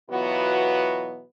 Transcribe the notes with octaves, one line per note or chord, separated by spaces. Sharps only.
B2 E3 F#3 B3 F4 F#4